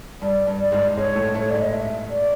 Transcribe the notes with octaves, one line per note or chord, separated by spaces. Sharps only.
G2 G3 D5
G2 G3
D5
G#2 G#3
G#2 G#3 C#5
A2 A3
A2 A3 C#5
G#2 G#3 D5
D#5
E5
D5